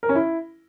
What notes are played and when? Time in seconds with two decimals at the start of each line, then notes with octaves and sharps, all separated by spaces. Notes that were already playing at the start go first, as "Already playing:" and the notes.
0.03 A#4
0.09 C#4
0.16 E4